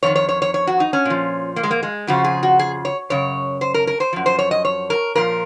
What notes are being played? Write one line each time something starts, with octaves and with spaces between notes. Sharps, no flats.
F2 D#3 C#5
C#5
C#5
C#5
C#5
F#4
D#4
C#4
A#2 F3
A#3
G#3
A#3
G#3
F2 C#3 F3 F#4
G#4
F#4
G#4
C#5
F#2 C#3 C#5
C5
A#4
A#4
C5
F#2 F3
C5
C#5
D#5
C#5
A#4
A#2 F3 A#4